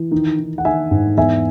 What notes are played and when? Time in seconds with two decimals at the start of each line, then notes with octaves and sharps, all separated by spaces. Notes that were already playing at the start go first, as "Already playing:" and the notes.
Already playing: E3
0.12 D#3
0.39 D#3
0.58 F#5
0.65 D#3 E5 G#5
0.91 G#2
1.17 E2 E5 G#5